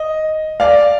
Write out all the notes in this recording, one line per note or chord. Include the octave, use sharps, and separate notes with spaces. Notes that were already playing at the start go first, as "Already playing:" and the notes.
Already playing: D#5
D5 F5